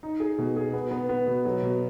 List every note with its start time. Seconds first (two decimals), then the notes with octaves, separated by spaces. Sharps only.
0.03 D#4
0.20 G#4
0.38 B2
0.56 G#4
0.73 B3
0.91 B3
1.09 B3
1.27 B2
1.45 F#3
1.62 B2